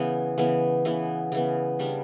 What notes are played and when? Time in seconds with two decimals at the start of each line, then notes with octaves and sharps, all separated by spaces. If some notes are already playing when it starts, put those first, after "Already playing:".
Already playing: C#3 E3 B3
0.38 C#3 E3 B3
0.85 C#3 E3 B3
1.32 C#3 E3 B3
1.79 C#3 G3 D4